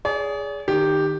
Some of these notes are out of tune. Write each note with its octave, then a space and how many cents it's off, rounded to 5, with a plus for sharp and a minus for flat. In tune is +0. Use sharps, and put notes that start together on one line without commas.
G#4 +0 D5 -45
D#3 -25 G4 +0